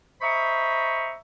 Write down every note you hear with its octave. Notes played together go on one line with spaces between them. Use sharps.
C5 D#5 E5 A#5 B5 C#6